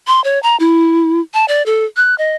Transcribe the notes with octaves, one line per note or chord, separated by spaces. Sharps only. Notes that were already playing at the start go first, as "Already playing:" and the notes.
C6
C#5
A#5
E4
A5
D5
A4
F#6
D#5